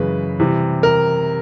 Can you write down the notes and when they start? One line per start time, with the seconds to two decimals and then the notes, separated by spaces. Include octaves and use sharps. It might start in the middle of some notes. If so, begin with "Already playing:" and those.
Already playing: F#2 C#3 E3 G#3 B4
0.40 C3 E3 G3
0.83 A#4